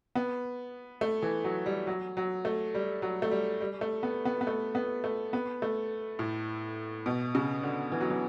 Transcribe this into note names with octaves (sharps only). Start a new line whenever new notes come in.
B3
A3
E3
F#3
G3
F#3
F#3
A3
G3
F#3
A3
G3
G3
A3
B3
B3
B3
A3
B3
A3
B3
A3
A2
B2
C#3
D3
E3
F#3
E3